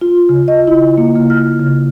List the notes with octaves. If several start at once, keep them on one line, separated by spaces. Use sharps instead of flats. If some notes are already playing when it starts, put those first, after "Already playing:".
F4
C#3
D#5
E4
A#3
C#3
F6
C#3